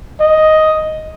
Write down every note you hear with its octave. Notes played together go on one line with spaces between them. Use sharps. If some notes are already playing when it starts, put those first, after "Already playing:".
D#5